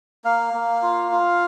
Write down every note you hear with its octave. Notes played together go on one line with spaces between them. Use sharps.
A#3 F5
A#3
F4
F4